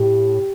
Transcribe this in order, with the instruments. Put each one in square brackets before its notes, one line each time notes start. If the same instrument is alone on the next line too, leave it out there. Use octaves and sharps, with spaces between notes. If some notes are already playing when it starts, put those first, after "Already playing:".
Already playing: [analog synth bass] A2 [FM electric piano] G4